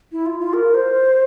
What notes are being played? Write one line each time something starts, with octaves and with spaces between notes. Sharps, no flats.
E4
F4
F4
A#4
C5